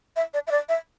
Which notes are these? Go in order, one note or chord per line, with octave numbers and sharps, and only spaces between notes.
E5
D5
E5
D5
E5